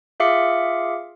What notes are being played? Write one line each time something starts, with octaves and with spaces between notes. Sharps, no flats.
F4 G#4 E5 F5 D6 C#7